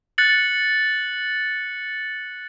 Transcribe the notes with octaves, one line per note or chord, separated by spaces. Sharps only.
F#6 A6 C#7 F#7